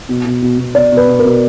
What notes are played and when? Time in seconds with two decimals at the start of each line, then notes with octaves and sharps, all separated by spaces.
0.09 B2
0.25 B2
0.42 B2
0.58 B2
0.75 B2 D5
0.92 B2
0.97 B4
1.08 B2
1.19 A#4
1.25 B2